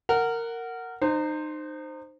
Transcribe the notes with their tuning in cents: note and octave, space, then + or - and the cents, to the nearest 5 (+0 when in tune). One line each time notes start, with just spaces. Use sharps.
A#4 -15 F#5 +0
D#4 -30 C5 +0